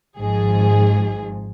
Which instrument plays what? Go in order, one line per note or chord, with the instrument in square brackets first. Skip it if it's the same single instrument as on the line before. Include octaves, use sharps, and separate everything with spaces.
[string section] G#1 G#2 F3 G#4